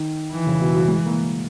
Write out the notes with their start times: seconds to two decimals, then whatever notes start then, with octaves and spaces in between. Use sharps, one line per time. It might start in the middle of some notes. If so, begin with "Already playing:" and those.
Already playing: D#3
0.33 E3
0.47 C#3
0.61 B2
0.74 F#3
0.88 G#3
1.06 A#3